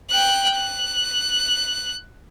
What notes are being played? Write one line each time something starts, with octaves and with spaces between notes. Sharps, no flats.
G5 F#6
F#6